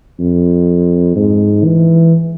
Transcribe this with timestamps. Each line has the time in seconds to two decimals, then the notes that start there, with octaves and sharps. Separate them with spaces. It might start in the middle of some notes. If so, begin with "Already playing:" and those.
0.20 F2
1.16 G#2
1.64 E3